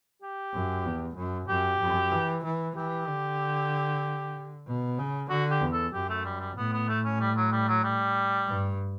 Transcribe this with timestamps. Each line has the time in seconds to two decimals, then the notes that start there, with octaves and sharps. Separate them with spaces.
0.22 G4
0.54 F#2
0.85 E2
1.16 F#2
1.49 F#2 G4
1.80 F#2
2.12 E3
2.44 E3
2.76 E3 G4
3.08 D3
4.67 B2
4.98 C#3
5.30 D3 F#4
5.51 G4
5.62 E2
5.73 A4
5.93 F#2 G4
6.10 A3
6.25 G3
6.41 G3
6.57 A2 B3
6.73 B3
6.88 A3
7.04 C#4
7.20 G3
7.37 F#3
7.52 G3
7.68 F#3
7.84 G3
8.48 G2